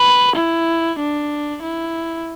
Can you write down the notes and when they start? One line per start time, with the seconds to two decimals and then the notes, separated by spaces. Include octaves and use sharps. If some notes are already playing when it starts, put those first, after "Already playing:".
Already playing: B4
0.36 E4
0.99 D4
1.62 E4